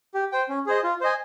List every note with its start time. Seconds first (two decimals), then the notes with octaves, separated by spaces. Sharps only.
0.14 G4
0.32 C5 G5
0.49 C#4
0.66 G#4 C5 D#5
0.84 F4
1.01 C5 D#5 G#5